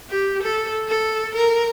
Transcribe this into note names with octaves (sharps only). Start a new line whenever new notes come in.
G4
A4
A4
A#4